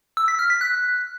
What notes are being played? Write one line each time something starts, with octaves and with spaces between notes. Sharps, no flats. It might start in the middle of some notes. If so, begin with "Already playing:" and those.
E6
B6
F6
B6
F#6